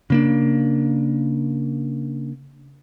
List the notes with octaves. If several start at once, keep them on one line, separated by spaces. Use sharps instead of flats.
C#3 A#3 D4